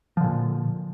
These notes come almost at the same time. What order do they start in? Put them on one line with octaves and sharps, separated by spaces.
F3 D3 A#2